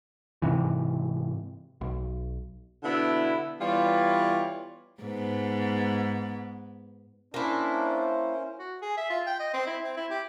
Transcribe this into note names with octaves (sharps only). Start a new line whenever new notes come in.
G#2 C3 E3
B1
B2 D3 B3 E4
E3 G3 B3 F4 C#5 D5
G#2 B3
A#3 C#4 D4 E4 C5
F#4
G#4
E5
F4
G5
D#5
C4
E4
C4
E4
G4